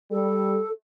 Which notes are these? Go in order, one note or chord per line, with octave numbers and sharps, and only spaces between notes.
G3 A4